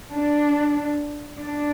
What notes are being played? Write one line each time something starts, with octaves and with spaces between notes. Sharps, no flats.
D4
D4